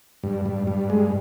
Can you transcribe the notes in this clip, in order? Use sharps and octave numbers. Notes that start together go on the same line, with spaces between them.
G2
G2
G2
G#3